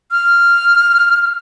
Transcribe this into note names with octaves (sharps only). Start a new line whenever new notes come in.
F6